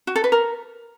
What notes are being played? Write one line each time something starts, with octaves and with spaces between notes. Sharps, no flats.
F#4
A4
B4
A#4